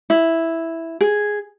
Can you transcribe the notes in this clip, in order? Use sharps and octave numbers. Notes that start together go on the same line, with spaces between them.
E4
G#4